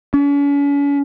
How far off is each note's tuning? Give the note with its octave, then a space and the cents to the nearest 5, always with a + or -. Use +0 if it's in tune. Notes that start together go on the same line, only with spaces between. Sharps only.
C#4 +40